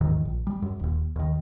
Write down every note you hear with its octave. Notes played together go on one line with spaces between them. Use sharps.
D#2 G#2 D#3 E3
A#1
G3
F#2
D#1 D#2
D#2 D#3